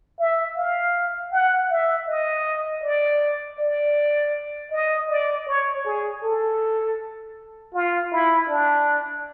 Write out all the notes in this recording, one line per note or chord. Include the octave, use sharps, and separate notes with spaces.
E5
F5
F#5
E5
D#5
D5
D5
D#5
D5
C#5
G#4
A4
F4
E4
D4